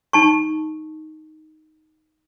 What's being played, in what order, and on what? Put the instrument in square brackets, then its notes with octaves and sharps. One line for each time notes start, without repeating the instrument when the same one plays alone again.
[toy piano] D#4 A5 C#6